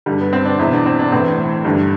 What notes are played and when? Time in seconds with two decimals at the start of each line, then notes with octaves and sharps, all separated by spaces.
0.06 G2 D3 G3
0.20 B3
0.33 C4
0.45 D4
0.59 E2 B2 E4
0.73 D4
0.86 C4
0.99 D4
1.12 A2 E3 C4
1.65 G2 D3